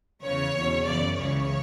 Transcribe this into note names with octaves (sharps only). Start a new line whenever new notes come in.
E2 C#3 E3 C#5
E2 B2
F#2 C#3 E3 D5
C#2 C#3 E3 C#5